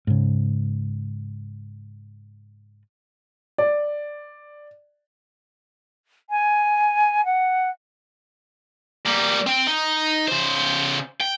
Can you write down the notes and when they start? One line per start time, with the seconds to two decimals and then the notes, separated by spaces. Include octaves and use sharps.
0.07 G#2 C#3
3.58 D5
6.30 G#5
7.25 F#5
9.06 G3 A#3
9.47 C4 G5
9.67 D#4
10.28 C#3 C5
11.20 G5